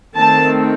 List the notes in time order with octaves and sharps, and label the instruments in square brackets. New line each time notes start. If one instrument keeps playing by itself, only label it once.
[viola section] D#3 A3 C4 A5